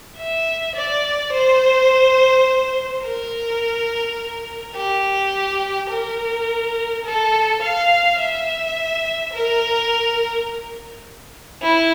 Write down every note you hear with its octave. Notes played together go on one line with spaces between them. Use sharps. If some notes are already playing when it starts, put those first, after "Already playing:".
E5
D5
C5
A#4
G4
A#4
A4
F5
E5
A#4
E4